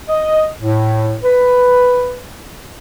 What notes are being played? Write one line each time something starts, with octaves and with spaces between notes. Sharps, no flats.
D#5
A2
B4